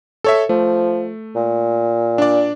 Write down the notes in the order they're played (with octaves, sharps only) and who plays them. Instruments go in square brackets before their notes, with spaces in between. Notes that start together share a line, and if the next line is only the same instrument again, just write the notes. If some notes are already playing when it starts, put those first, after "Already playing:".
[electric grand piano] A4 C#5 E5
[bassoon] F3 [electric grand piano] A3
[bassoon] A#2
[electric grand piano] D4 D5